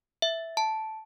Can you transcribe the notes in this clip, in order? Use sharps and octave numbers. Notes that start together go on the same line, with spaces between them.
E5
A5